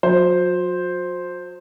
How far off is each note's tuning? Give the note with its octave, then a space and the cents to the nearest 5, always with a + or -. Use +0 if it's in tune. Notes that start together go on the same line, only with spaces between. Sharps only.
F#3 -40 C5 +0